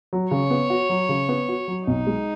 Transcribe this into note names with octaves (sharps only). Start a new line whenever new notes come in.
F#3
C#3 C#5
B3
F#4
F#3
C#3
B3
F#4
F#3
B1 D#4
G#3